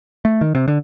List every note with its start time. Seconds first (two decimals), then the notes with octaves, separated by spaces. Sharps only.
0.25 A3
0.41 D#3
0.55 C3
0.68 D3